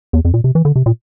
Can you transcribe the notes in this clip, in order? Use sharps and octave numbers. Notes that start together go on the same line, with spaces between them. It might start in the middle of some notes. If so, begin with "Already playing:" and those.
E2
F2
A#2
C3
E3
D3
C3
A#2